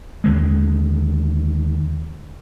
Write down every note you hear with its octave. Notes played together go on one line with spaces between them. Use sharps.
D#2 D3 G#3